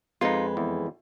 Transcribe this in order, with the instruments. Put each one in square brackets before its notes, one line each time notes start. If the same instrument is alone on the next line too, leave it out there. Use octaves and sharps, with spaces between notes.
[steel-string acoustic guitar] F2 G#3 B4 [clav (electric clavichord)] D#4 F4
[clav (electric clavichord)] E2